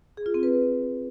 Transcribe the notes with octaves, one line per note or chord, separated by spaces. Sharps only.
G#4
F4
C4
B4